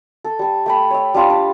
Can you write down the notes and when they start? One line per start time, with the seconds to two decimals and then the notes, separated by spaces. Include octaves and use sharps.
0.24 A4
0.39 G3 A4
0.66 A3 G5 B5
0.91 C#5 E5
1.14 G3 D4 F4 G4
1.30 D4